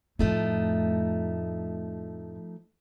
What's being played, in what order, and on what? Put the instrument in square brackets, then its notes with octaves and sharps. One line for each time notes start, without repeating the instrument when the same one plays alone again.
[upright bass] F2 A2 [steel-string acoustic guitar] F3 A3 D#4